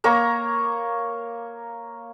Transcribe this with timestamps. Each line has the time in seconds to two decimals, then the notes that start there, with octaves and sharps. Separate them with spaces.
0.04 A#3 A#4 C#5 A#5